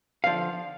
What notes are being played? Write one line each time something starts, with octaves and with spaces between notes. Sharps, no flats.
D3 F3 F5